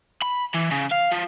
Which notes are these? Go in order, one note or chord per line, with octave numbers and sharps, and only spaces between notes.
B5
E3
C#3
F5
F3